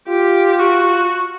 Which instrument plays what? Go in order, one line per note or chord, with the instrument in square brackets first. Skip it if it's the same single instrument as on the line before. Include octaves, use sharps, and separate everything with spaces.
[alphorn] F4 [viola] G4
[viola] F#4